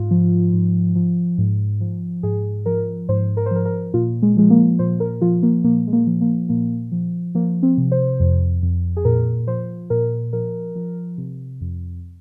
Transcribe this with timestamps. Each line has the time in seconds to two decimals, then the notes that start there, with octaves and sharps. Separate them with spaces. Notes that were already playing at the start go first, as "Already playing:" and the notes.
Already playing: G#2 F4
0.11 F3
0.53 G#2
0.96 F3
1.38 G#2
1.81 F3
2.23 G#2 G#4
2.66 F3 A#4
3.09 G#2 C5
3.37 A#4
3.46 C5
3.51 F3 A#4
3.65 A#4
3.94 A#2 F4
4.22 G#3
4.36 F3 G#3
4.50 A#3
4.79 A#2 C5
5.00 A#4
5.22 F3 F4
5.43 A#3
5.64 A#2 A#3
5.87 G#3
5.93 A#3
6.07 F3
6.21 A#3
6.49 A#2 A#3
6.92 F3
7.35 F3 A#3
7.63 C4
7.77 C3
7.92 C5
8.20 F2
8.62 F2
8.97 G#4
9.05 A#2 A#4
9.47 F3 C5
9.90 A#2 A#4
10.33 F3 A#4
10.75 F3
11.18 C3
11.61 F2